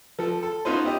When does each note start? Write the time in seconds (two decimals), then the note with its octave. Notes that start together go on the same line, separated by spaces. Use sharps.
0.19 F3 A4
0.43 A4
0.65 B3 C#4 D#4 F4 B4 C5
0.85 E4 G4 D#5